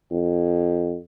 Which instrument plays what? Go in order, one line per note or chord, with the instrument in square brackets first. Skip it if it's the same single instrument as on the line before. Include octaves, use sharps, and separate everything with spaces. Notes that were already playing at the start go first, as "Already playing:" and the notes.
[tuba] F2